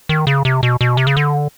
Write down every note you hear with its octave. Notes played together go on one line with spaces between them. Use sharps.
D#3
C#3
C3
B2
B2
C3
C#3
D3